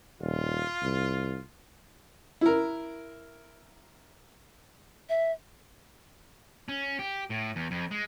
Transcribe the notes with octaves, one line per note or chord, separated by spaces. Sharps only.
D#1 F4
C2
E4 A#4
E5
C#4
G4
A2
E2
F2
G#3